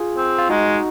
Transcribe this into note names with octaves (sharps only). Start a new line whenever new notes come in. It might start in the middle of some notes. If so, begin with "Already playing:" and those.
Already playing: F4 G#4
C4
F4
G#3 D#4 F#4